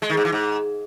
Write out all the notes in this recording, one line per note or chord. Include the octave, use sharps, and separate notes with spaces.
G#3
D#3
G#2
E3
G#2